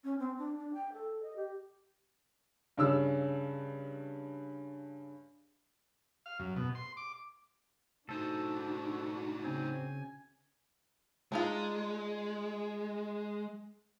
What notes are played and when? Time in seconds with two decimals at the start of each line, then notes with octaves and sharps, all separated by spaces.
0.04 C#4
0.19 C4
0.38 D4
0.56 D4
0.74 G5
0.93 A4
1.23 D#5
1.36 G4
2.77 G2 C#3 E6
6.26 F5
6.39 F#2
6.56 B2
6.75 C6
6.97 D6
8.09 A2 D4 D#4 F#4 A4 C5
9.44 C#3 C4 G#5
11.32 G#3 D4 D#4 F4